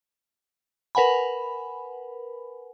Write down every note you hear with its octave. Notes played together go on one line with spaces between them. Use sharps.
A#4 B4 F#5 G#5 B5